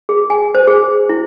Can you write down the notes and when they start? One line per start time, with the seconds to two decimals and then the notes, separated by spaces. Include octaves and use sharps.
0.09 G#4
0.30 G#5
0.55 C5
0.67 G#4
1.09 E4